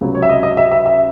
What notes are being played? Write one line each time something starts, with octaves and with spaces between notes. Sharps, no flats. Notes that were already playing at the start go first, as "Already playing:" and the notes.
C#2 C3 F#3
C#5
E5
D#5
D#5
E5
E5
E5